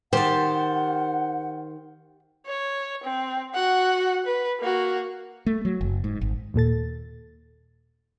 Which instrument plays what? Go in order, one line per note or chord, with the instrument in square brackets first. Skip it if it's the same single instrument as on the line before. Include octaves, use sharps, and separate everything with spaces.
[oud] D#3 [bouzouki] G4 A5 [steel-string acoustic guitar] C5 [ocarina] F#5
[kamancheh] C#5
C4
F#4 F#5
B4
A#3 F#4
[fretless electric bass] A3
F#3
F#1
G#2
G#1
[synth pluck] D#2 A#2 A4 A6